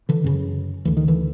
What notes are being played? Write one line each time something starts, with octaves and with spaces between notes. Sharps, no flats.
D3 E3
F#2 C#3
D2 D3 E3
D#3
D3 E3